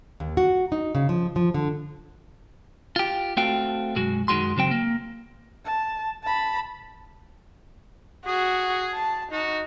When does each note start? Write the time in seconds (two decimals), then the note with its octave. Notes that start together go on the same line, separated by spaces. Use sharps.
0.20 D#2
0.37 F#4
0.72 D#4
0.95 C#3
1.09 F3
1.36 F3
1.54 D3
2.96 F4 G4
3.37 A3 C4 F#4 A4 F5 G5
3.95 B1 F#2 G#3 F#4
4.28 F#2 D#3 F#3 G#3 F#4 C6
4.57 C#3 F#3 C4 G5
4.71 A#3
5.65 A5
6.23 A5 B5
8.27 F#4 G#4
8.94 A5
9.32 D#4 F#4